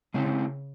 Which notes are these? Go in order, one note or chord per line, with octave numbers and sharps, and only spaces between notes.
C#3 G#3 C4 E4